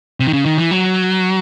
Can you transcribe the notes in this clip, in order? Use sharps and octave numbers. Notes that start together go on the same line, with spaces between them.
C3
D#3
C#3
D#3
E3
F#3